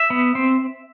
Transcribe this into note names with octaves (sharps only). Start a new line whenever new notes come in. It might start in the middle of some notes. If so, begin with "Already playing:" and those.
Already playing: E5
B3
C4